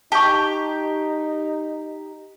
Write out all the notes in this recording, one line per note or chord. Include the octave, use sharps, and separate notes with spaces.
D#4 G4 A5 C#6